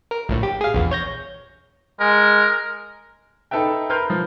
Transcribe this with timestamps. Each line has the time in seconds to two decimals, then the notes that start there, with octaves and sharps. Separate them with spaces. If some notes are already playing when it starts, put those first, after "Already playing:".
0.11 A#4
0.29 A#1 A2
0.43 G4
0.61 G#4 F5
0.74 A#1 E2
0.91 C#5 G6 A#6
2.00 G#3 A#4
3.51 D#4 A4 B4 E5 G5
3.90 A#4 B4 C6 F6 G6
4.10 F3